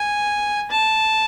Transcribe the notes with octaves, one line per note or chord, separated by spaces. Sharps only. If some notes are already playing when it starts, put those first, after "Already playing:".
Already playing: G#5
A5